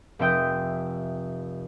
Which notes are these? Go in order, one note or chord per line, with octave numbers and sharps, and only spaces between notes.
F1 C4 E5 G5 D#6 G6